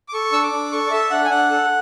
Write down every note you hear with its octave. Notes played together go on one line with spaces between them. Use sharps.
D6
A4 C#6
D4 E6
D6
D4
A4 C#6
D5
A4 E5
D4 F#5
G#5
D4 F#5
A4